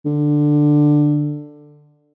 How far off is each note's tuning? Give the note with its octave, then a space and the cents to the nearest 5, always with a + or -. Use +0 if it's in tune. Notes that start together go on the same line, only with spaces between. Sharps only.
D3 +10